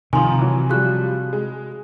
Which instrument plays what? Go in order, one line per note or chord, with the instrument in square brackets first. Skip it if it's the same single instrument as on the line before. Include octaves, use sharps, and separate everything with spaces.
[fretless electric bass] C3 [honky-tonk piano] D#3 F3 [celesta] G#5 C6
[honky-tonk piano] E3 F#3
[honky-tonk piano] F3 G3 [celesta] F#4 G#4 F#6
[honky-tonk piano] G#3